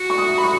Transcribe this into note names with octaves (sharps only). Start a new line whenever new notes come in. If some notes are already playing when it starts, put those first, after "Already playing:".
Already playing: F#4
C#6
D#6
B5
C#6